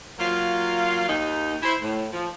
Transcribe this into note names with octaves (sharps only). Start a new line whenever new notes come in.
F#3 A#3 F4
D#2 D#4
E4 C5
A2
F3